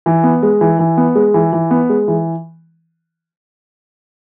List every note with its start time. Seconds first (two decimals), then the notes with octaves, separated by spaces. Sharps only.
0.06 E3
0.24 B3
0.43 G#3
0.61 E3
0.79 E3
0.97 B3
1.15 G#3
1.34 E3
1.53 E3
1.71 B3
1.90 G#3
2.08 E3